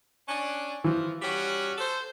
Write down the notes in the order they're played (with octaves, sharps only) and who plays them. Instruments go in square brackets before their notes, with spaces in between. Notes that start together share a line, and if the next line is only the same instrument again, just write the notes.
[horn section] C#4 D4
[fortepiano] E3 [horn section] F3
[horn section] G3 C#4 F#4
A4 C5